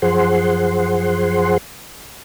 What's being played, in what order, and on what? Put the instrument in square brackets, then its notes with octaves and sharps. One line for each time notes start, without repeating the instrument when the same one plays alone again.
[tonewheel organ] F#2 F3 G#4 C5 F#5 C6